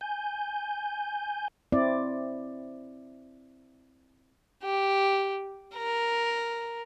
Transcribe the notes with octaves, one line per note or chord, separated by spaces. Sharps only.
G#5 G6
C4 E4 D5
G4
A#4